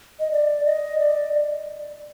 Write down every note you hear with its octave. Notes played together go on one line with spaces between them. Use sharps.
D#5
D5
D#5
D5